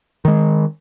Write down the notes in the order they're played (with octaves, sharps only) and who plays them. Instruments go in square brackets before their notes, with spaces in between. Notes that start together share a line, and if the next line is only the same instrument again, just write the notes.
[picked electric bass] D#3 G#3